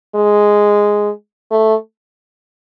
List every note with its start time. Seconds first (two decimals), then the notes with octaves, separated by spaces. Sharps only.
0.15 G#3
1.51 A3